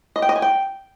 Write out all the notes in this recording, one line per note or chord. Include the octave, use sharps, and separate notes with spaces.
D#5
G5
D#5
G#5
G5